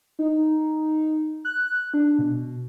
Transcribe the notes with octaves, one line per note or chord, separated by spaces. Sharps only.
D#4
F#6
D4
B2